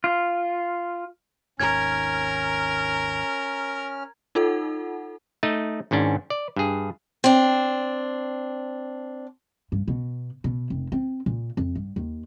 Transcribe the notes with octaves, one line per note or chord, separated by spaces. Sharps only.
F4
G#1 D#2 D#3 C#4 A#4 A#5 F6 G#6
D#4 F4 A4 F#5
A3 D#4 D#5
G#1 G#2 C#4 D4
D5
G2 G#4
C4 D4
G2
B2
B2
F1
C4
A#2
F2
G2
D#2